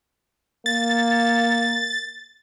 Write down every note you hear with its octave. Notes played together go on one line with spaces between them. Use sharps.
A#3 A6